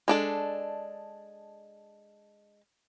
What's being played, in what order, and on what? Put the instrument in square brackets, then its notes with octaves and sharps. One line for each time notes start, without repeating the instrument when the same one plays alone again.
[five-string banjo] G#3 D4 A4